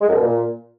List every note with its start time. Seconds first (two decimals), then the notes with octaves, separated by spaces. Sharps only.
0.01 G#3
0.08 F#2
0.15 B2
0.21 A#2